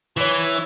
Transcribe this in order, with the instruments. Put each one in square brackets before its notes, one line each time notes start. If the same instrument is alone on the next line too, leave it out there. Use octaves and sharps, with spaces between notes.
[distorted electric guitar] E3 [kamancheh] C#5